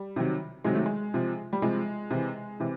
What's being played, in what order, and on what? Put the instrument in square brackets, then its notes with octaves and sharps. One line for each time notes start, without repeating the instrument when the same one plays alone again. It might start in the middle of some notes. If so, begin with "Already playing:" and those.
Already playing: [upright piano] G3
C3 D#3 F#3
C3 D#3 F#3 G#3
A3
G#3
C3 F3
G3
C3 F3 G#3
C3 E3
C3 E3